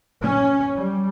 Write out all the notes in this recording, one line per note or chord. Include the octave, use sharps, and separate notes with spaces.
C#4
G3